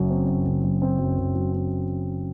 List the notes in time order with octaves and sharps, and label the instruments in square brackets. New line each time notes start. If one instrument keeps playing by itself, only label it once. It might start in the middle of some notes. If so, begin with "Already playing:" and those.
Already playing: [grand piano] F#1 F#2 F#3
C4
F#2
F#1
F#3
C4
F#2
F#1
F#3
C4